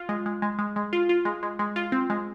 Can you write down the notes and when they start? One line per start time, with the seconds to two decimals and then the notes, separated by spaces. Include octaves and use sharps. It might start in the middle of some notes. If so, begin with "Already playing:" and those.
Already playing: F4
0.09 G#3
0.26 G#3
0.42 G#3
0.59 G#3
0.76 G#3
0.93 F4
1.09 F4
1.25 G#3
1.43 G#3
1.59 G#3
1.76 F4
1.92 C4
2.10 G#3